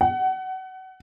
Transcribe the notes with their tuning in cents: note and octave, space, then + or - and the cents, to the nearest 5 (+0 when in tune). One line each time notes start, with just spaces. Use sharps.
F#5 +25